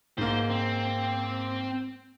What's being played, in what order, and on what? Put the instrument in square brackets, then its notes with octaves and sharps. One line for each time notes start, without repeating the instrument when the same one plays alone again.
[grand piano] G#2 A#3 [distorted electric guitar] C5
[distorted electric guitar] C4